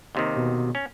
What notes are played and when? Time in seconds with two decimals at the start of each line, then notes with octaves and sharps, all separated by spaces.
0.15 D#2 C3 D#3
0.36 B2
0.75 C#4